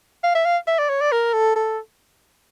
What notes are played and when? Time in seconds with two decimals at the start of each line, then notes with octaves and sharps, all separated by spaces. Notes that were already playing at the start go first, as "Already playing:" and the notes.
0.24 F5
0.35 E5
0.46 F5
0.68 E5
0.79 D5
0.89 C#5
1.01 D5
1.12 A#4
1.34 A4
1.56 A4